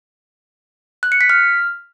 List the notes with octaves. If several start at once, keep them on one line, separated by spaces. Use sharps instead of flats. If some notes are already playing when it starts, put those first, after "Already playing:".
F#6
C#7
B6
F6